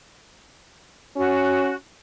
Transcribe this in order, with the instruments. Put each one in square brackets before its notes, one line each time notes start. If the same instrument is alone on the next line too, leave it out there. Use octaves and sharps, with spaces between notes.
[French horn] C#4 [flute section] F#4